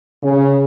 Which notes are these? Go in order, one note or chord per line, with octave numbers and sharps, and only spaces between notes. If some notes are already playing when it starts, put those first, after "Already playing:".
C#3